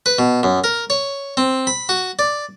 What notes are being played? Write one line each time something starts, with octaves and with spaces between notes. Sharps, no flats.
B4
B2
F#2
A#4
C#5
C4
B5
F#4
D5